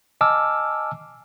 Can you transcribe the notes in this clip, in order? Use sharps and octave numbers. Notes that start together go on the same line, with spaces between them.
D#5 G#5 A5 D6 E6 F6